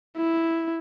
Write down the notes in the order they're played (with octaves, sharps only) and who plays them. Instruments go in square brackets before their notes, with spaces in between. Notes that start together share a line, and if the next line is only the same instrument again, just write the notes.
[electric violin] E4